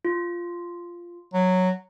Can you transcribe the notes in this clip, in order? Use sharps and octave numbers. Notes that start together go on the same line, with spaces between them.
F4
F#3